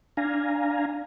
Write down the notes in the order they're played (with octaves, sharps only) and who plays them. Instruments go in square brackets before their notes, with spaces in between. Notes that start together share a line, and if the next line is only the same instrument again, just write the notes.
[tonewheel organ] D4 F5 G#5 A#5